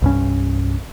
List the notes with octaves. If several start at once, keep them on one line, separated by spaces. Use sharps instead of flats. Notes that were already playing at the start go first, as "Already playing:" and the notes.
C2 G2 C#4